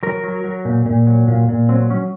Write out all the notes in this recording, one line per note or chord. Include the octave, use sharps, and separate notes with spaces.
F#3 A#4
F#3
F#3
A#2
A#2
F#3
A#2
A#2
F#3 C4
F#3 C#4